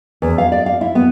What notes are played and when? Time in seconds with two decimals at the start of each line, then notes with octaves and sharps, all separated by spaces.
0.22 E2
0.38 F5
0.52 D5
0.66 F5
0.81 E4
0.95 B3